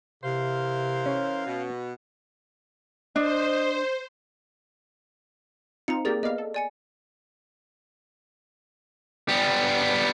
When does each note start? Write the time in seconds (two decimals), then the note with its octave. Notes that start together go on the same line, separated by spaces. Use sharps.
0.24 C3 E3 A#4 C5 F5
1.06 C#4
1.46 B2
3.16 D4 C5 D#5
5.88 C4 D#4 F4 A#5 C#7
6.05 A#3 G4 G#4 A#4 D5 A6
6.23 B3 D5 D#5 F5
6.38 A4
6.54 D5 G#5 C#7
9.28 G3 B3